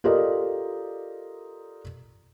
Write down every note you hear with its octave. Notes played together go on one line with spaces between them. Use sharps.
F4 G4 A4 A#4 D5 D#5